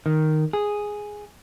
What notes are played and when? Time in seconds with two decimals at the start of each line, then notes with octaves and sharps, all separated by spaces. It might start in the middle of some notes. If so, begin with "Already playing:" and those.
0.06 D#3
0.53 G#4